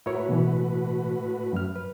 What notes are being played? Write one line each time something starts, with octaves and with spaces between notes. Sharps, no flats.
A2 E4 F#4 A#4 B4 C#5
B2 E3
F#2 F6
B4